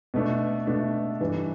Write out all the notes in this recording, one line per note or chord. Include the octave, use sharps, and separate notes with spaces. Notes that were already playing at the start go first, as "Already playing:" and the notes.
B2 A3 D4
B2 A3 D4
G2 E3 G3 D4